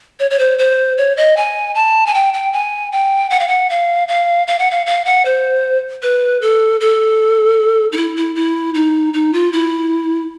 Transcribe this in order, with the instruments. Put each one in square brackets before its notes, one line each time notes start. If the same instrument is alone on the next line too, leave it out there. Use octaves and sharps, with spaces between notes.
[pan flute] C#5
C#5
C5
C5
C#5
D#5
G#5
A5
G#5
G5
G5
G#5
G5
F#5
F5
F#5
F5
F5
F5
F#5
F5
F5
F#5
C5
B4
A4
A4
D#4
E4
E4
E4
D#4
D#4
F4
E4